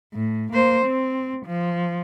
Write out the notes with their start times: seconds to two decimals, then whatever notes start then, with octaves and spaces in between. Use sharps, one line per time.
0.13 A2
0.53 A#3 C5
0.86 C4
1.46 F3